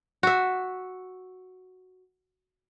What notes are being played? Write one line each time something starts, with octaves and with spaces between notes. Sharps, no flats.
F#4 E5